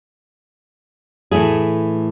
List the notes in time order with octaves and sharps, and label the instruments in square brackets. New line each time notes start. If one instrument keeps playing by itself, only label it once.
[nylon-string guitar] A2 E3 A3 E4 G#4